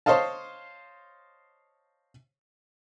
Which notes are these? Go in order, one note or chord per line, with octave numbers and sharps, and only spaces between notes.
C5 C#5 D#5 F5 A5